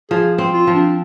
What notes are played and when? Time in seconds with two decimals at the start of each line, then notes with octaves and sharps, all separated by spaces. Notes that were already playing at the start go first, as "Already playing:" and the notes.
0.11 F3 G#4
0.38 C4
0.54 F4
0.67 F3
0.74 D4